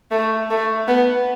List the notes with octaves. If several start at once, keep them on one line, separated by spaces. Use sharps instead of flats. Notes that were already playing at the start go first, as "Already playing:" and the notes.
A3
A3
B3